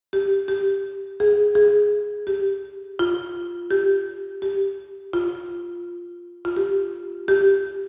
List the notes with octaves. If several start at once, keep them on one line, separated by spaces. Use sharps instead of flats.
G4
G4
G#4
G#4
G4
F4
G4
G4
F4
F4
G4
G4